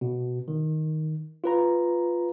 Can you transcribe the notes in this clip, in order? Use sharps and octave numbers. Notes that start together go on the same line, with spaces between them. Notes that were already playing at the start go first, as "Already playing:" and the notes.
B2
D#3
F4 B4 A#5